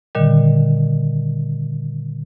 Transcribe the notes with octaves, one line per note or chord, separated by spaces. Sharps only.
A#2 D3 D#3 G3